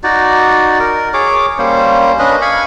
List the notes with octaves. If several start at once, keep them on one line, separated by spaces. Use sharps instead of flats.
D#4 F#4 D5
A#4
G#4 C#5 D6
G3 A#3 C#4 C5
C#4 D4 B4 D#5
F5 G#5 B5 C#6